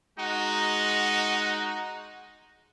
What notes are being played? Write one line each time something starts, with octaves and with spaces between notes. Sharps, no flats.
G#3 D#4 F#4 F#5